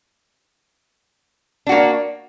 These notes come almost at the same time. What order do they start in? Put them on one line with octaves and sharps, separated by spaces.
D4 F#4 A#3